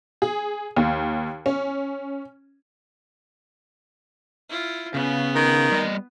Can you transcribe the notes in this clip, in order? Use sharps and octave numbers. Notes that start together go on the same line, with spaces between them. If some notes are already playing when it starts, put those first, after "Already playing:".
G#4
D#2
C#4
E4 F4
C#3 B3
D#3
G3 D#5